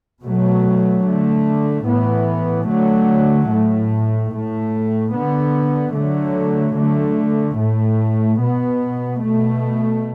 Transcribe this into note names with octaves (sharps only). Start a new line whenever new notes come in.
B2 F#3 A3
D3 A3
A2 E3 B3
D3 F#3 A3
A2 A3
A2 A3
D3 B3
D3 F#3 A3
D3 A3
A2 A3
B2 B3
B2 A3